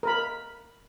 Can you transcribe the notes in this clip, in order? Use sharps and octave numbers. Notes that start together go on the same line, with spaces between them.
A#4 B5